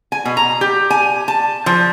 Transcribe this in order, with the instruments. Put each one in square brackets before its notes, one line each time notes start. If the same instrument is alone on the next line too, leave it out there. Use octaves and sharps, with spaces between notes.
[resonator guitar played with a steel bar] G#5
B2
A#5
G4
G#5
A5
F3